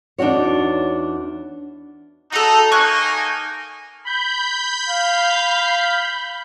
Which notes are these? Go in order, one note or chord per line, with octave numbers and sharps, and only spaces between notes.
E2 D4 D#4 F#4 C#5
D#4 F#4 A4
A#3 D#4 G#5 C#6 F#6
B5 G6
F5